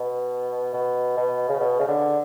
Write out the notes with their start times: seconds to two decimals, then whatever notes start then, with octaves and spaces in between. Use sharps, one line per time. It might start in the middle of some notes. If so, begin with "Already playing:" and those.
Already playing: B2
0.74 B2
1.17 B2
1.49 C#3
1.60 B2
1.80 C#3
1.88 D3